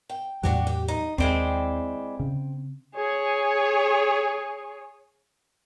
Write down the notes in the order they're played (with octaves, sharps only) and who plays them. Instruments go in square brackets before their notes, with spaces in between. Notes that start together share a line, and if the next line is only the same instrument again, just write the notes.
[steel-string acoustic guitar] G5
[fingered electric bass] E2 A2 F#3 [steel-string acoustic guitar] D4 F#4 G4
[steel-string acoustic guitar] G4
D#4
[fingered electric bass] D#2 [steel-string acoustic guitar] G#3 E4 D5 [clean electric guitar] C4 G5
[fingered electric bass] C#3
[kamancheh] G#4 C#5